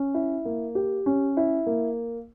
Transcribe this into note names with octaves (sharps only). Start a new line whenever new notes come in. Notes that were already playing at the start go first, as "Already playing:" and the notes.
Already playing: C#4
E4
A#3
G4
C#4
E4
A#3